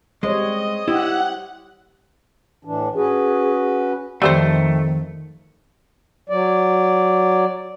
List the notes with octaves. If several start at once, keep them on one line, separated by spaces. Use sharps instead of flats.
G3 G#3 C5 C#5 D#5
E4 G4 F#5
A2 E3 D4
C#4 F#4 G#4 B4
F2 D#3 G3 A3 C4 C5
F#3 D5